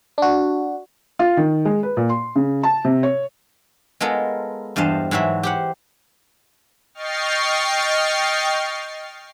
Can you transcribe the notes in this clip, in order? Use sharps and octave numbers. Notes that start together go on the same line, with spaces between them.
D4 F#4
F4
D#3
G#3
B4
A#2
C6
C#3
A5
C3
C#5
G#3 B3 F4 A4 A#4
E2 G2 C5 D#5 F5 A5
G#2 E3 F#3 F#4 E5
G4 C5 F#5
D#5 G5 C#6 F6 A6 C7